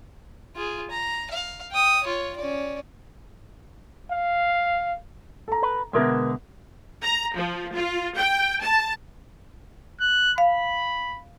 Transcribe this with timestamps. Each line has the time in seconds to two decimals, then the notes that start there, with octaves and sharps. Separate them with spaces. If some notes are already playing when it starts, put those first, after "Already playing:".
0.56 F4 G#4
0.90 A#5
1.31 F5
1.72 G5 D#6
2.03 F4 C#5
2.36 C#4 D5
4.12 F5
5.48 A4 A#5
5.62 B4
5.93 B2 D3 G#3 B3 A#4 E5
7.03 A#5
7.37 F3
7.74 F4
8.17 G5
8.62 A5
10.00 F#6
10.38 F5 B5